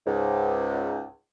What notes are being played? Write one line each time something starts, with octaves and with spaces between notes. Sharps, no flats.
C#2 G#2